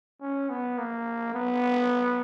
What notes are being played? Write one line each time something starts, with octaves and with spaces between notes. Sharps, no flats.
C#4
B3
A#3
B3